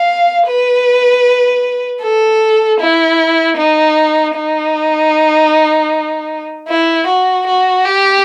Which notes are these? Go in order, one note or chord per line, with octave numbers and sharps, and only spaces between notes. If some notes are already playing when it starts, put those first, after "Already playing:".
Already playing: F5
B4
A4
E4
D#4
D#4
E4
F#4
F#4
G4